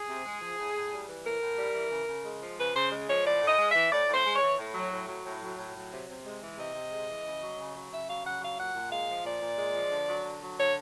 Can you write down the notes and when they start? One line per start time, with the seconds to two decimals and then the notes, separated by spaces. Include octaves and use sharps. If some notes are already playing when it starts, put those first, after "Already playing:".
Already playing: G#4
0.09 C3
0.25 G#3
0.41 F3
0.59 A2
0.75 A2
0.92 G3
1.09 E3
1.25 A2 A#4
1.42 A2
1.58 G3
1.75 E3
1.91 C#3
2.08 C#3
2.25 G#3
2.42 F3
2.58 C#3 B4
2.75 C#3 C5
2.92 G#3
3.08 F3 C#5
3.25 A2 D5
3.41 A2
3.47 D#5
3.58 G#3
3.70 E5
3.75 E3
3.92 A2 D5
4.08 A2
4.14 C5
4.25 G#3
4.36 C#5
4.41 E3
4.58 A2
4.75 F#3
4.92 A2
5.08 F#3
5.25 A2
5.42 F#3
5.58 A2
5.75 F#3
5.91 C3
6.08 C3
6.25 G#3
6.42 E3
6.58 C3 D#5
6.75 C3
6.92 G#3
7.08 E3
7.25 C#3
7.41 F#3
7.58 C#3
7.75 F#3
7.91 C#3 E5
8.08 F#3 F5
8.24 C#3 F#5
8.41 F#3 F5
8.58 A#2 F#5
8.75 A#2
8.91 G#3 F5
9.08 F3
9.25 A#2 D5
9.42 A#2
9.58 G#3
9.75 F3
9.91 D3
10.08 F#3
10.24 D3
10.42 F#3
10.58 D3 C#5